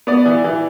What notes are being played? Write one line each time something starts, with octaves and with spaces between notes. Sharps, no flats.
B3 D5
E3
E3